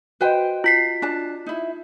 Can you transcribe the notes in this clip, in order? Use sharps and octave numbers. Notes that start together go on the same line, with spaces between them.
F#4 B4 C5 D#5 G5
F4 B6 C7
D4 A5
D#4 E4